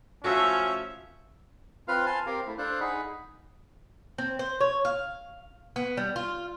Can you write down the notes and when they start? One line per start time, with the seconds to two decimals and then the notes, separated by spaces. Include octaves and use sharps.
0.24 F3 A3 C#4 F#4 E5
1.88 C4 F4 B4 F5 F6
2.06 G#5 A5 C6 F6
2.26 C4 G4 A#4 F5
2.47 A3 E4
2.58 D4 A4 C5 F5 F#6
2.80 D#4 G#4 F#5 B5
4.18 C4
4.39 C5
4.60 C#5
4.85 F5
5.76 B3
5.97 G3
6.16 F4